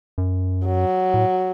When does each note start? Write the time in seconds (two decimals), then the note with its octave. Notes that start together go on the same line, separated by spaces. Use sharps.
0.18 F#2
0.66 F#3
1.14 A2